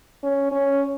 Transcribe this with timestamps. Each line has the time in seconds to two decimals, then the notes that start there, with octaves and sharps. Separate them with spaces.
0.23 C#4
0.52 C#4